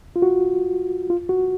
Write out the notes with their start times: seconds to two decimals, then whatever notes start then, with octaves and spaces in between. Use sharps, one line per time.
0.16 F4
0.22 F#4
1.10 F4
1.29 F#4